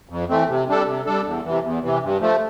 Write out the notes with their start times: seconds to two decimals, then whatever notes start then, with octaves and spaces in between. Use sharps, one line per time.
0.09 F2
0.29 E3 A3 C4
0.49 C3
0.68 G3 D4 A4
0.86 C3
1.06 G3 D4 A4
1.25 E2
1.44 C3 E3
1.64 E2
1.83 C3 E3
2.02 G2
2.21 F3 A3